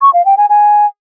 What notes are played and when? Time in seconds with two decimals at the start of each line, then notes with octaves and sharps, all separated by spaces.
0.02 C#6
0.14 F5
0.25 G5
0.37 G#5
0.49 G#5